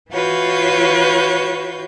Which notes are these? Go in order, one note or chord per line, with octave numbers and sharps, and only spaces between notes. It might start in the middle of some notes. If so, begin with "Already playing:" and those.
E3 F4 F#4 B4 C#5 G6